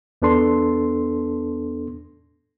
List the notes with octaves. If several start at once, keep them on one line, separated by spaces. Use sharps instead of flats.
E2 B3 D4 A4 C6